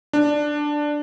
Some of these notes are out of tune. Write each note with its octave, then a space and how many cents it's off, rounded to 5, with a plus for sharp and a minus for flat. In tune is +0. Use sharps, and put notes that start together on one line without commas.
D4 +5